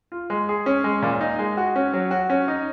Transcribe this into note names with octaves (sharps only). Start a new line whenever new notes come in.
F4
G#3
G#4
C#4
G#3
A#2
D#4
G#3
F#4
C#4
F#3
F#4
C#4
D#4